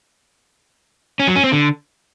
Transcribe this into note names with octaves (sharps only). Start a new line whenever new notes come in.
C#4
F#3
C#4
C4
D3